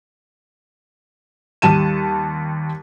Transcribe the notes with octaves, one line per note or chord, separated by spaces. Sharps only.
D#2 G3 A5 D#7 E7